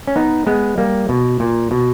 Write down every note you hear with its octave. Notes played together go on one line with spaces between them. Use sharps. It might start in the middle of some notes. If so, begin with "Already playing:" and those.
C#4
B3 D#4
G#3 B3
G3 A#3
B2
A#2
B2